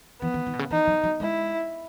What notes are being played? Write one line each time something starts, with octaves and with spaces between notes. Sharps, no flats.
E3 B3
D#3
D#3
B2
C#3
E3 D#4
F#3
F#3
G#3 E4